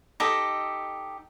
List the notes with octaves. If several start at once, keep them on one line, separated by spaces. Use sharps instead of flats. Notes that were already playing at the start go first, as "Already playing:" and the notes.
D#4 G4 A4 D#5